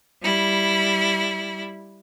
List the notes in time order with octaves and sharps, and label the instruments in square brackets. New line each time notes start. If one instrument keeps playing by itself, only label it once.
[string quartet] G3 E4